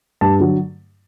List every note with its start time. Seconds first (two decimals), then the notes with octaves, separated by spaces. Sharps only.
0.21 G2 A5
0.39 D3 F#3